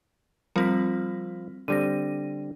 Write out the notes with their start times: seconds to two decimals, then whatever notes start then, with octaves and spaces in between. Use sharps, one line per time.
0.56 F3 G3 C4 A#4 B6
1.68 D3 G3 C4 A#6 D#7